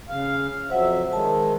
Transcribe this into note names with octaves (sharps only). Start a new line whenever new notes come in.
C#3 F5
F2 F#3 C5 E5 F#5
D#3 G#3 A5